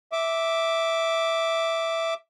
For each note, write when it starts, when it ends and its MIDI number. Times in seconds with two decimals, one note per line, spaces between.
0.12 2.14 76
0.12 2.14 86